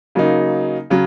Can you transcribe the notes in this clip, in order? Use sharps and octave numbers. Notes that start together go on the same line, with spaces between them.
C#3 F#3 A#3 D#4
C#3 F#3